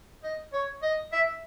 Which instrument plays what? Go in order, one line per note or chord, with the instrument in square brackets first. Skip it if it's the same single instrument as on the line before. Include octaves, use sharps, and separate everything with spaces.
[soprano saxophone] D#5
C#5
D#5
E5